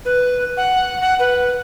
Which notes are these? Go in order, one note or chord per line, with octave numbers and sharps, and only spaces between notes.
B4
F#5
F#5
B4